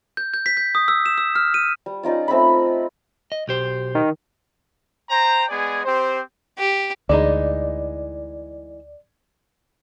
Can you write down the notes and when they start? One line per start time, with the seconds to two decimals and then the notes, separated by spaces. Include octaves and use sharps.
0.17 G6
0.34 G6
0.46 B6
0.57 G6
0.75 D#6
0.88 E6
1.06 E7
1.18 E6
1.36 F6
1.54 D#7
1.86 G3
2.03 C#4 D#4 F4 D5
2.28 A3 C4 C#5 B5
3.32 D#5
3.48 B1 G4 C5
3.95 D#3
5.10 C5 G5 A#5
5.49 G#3 B3 G#4 D5 G#5
5.84 C4 G4 C5
6.58 G4
7.09 D2 E3 G#3 D#4 D5